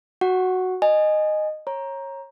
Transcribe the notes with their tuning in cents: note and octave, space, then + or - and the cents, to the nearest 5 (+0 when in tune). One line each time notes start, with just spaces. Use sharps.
F#4 +0 F#5 +0 C#6 +0
D#5 -10 G#5 +0
C#5 -25 A#5 +10